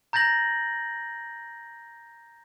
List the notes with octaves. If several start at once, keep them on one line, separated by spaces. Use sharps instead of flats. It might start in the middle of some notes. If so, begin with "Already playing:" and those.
A#5 G6 A6 A#6 F#7